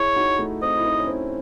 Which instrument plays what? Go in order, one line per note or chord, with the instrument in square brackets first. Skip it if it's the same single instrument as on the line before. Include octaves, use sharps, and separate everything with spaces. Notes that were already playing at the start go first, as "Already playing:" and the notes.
Already playing: [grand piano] E4 G#4 [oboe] C#5
[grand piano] D#4 F#4
A3
[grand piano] C4 [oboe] D#5
[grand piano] E4
C4 D#4
C#4
C4